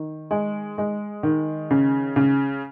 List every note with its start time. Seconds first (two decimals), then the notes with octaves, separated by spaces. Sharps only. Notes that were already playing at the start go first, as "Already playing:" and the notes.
Already playing: D#3
0.31 G#3
0.78 G#3
1.23 D#3
1.71 C#3
2.16 C#3